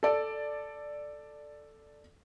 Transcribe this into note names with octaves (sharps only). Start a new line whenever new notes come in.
A4 D5